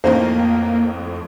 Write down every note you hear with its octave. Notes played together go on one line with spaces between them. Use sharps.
F2 A2 E3 A#3 D#4 C5